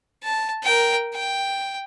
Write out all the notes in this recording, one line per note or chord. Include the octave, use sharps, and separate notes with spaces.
A5
A#4 G5
G5